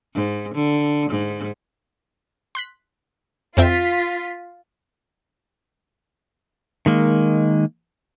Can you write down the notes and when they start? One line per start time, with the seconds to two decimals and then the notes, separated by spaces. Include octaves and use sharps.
0.14 G#2
0.55 D3
1.11 G#2
2.55 C6 F#6 B6
3.57 F2 C4 F4 E5 B6
6.86 D#3 G#3 A#3